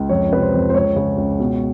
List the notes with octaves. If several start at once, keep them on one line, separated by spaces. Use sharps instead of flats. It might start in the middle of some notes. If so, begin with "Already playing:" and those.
Already playing: C#2
F2 C#5
C3 B4
C5
F2
C5
C#2 C#5
C#3
C#2
B2